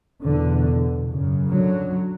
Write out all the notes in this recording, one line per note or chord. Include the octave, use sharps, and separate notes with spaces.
E2 B2 D3
F#2 C#3
D3 F#3